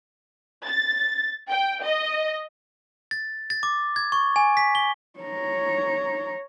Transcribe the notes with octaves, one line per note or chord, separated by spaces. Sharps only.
A6
G5
D#5
A6
A6
D6
G#6
C#6
G#5
B6
G7
C#5 A#5